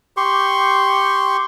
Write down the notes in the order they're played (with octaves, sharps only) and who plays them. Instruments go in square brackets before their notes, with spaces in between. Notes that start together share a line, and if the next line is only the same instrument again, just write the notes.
[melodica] G4 C6 C#6